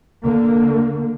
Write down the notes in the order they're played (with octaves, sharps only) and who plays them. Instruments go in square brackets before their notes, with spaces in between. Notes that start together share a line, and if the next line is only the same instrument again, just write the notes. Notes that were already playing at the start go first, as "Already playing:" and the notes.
[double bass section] D3 A#3